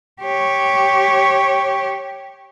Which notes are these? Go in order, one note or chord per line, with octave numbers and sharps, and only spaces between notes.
G4 C#5